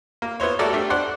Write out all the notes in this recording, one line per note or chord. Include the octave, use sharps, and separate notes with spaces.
A#3
B3 E4 C5 C#5
G3 A3 F#4 A4 A#4 D5
G3 A3 D4
C5 D5 F#5